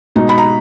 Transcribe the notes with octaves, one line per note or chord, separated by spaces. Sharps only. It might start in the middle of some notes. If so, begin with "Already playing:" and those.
B2 G#3 D#4
B5
A#5